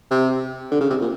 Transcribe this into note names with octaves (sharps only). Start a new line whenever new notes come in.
C3
D3
C#3
C3
A#2